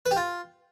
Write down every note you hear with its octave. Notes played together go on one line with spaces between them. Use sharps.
B4
G4
F4